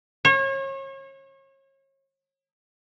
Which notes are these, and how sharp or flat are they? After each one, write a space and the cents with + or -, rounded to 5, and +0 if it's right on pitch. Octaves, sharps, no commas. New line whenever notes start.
C#5 -35